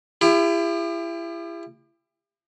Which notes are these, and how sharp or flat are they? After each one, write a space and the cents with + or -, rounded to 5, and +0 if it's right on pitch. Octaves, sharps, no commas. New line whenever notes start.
E4 +35 G4 +40